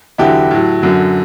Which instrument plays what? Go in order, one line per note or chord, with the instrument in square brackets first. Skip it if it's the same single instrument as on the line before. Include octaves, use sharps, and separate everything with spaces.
[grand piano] E2 D3 F#3 E4 G4
A2 F#3
F#2 D3 F#3